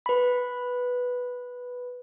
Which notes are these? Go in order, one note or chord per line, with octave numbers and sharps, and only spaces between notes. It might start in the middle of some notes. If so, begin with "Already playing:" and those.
B4 B5